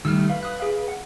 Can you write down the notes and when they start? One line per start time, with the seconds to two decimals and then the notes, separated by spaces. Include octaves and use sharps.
0.05 D#3 G3 A3 E6 F6
0.30 B4 F5
0.43 D#6 F#6
0.60 G#4 F5
0.88 F#5